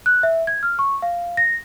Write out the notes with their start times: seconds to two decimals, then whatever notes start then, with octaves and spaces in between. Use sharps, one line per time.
0.06 F#6
0.23 E5
0.47 G#6
0.63 F6
0.79 C#6
1.02 F5
1.37 A#6